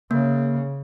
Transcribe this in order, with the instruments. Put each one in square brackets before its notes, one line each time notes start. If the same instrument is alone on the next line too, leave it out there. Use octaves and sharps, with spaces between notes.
[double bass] C#3 [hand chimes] A#3